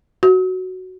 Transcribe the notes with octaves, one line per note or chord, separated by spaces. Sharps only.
F#4